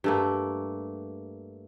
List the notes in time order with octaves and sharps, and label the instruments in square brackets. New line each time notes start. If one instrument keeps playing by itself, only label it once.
[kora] G2 A3 A#3